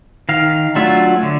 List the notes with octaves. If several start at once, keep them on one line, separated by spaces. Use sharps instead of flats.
D#3 F5
F#3 A3 D4 F4 E5
D3